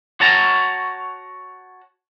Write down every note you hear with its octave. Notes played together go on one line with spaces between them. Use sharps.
F#4 C#5 A5 A#5